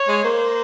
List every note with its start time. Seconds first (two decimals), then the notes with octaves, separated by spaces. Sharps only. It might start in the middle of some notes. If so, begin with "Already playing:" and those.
Already playing: C#5
0.09 G#3
0.24 A#3 C5